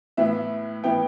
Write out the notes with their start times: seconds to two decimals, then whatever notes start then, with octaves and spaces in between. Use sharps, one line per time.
0.17 A2 E3 B3 E5
0.84 A2 E3 B3 G5